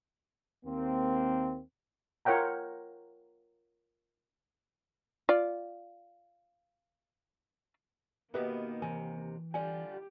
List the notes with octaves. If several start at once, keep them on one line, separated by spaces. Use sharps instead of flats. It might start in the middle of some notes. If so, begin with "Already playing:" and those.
D#2 A#3 C4
F4 A#4 C#5 F#5 G5 A#5
F4 D5
B2 D#3 A#3 B3 G4 B4 E5
D#2 C3 E3 G#5
D3 G3 F4 G4 G#5